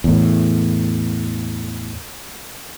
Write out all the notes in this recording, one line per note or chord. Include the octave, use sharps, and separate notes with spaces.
E2 A2